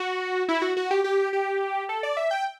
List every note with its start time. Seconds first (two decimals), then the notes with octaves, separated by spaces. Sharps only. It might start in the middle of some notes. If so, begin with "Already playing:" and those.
Already playing: F#4
0.49 E4
0.62 F#4
0.77 F#4
0.91 G4
1.04 G4
1.33 G4
1.89 A4
2.03 D5
2.17 E5
2.31 G5